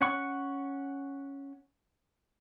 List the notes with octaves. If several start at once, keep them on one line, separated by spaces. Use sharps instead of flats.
C#4 F#5 C#6